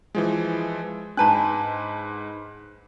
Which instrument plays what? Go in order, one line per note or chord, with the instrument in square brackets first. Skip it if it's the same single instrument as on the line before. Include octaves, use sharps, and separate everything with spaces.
[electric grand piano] E3 F3 G#3
[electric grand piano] G#2 B4 F#6 [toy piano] D4 A5 A#5